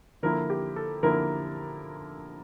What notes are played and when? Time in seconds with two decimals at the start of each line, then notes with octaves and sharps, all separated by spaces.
0.23 D3 F3 A#3 E4 A#4
0.50 G4
0.76 A4
1.03 D3 F3 A#3 E4 A#4